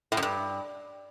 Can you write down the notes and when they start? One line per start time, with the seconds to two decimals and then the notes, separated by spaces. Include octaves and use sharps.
0.12 A2
0.17 F#2
0.22 G2